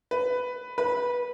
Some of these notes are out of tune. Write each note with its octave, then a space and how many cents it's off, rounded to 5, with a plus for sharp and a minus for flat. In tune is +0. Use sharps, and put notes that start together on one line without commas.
B4 +10
B4 -15